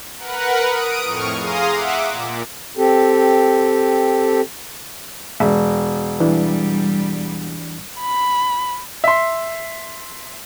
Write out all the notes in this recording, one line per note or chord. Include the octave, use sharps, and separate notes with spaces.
A#4 B4 F#5
D#6 D7
F2 A2 C#6 F6
G#4 F5 A#5 C6 D#6
E5 F#5 D6
A#2
C4 G4 A4
E1
E3 G3 D4
B5
E5 C6